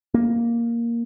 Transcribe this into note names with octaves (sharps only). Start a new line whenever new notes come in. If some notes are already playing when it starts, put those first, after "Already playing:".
A#3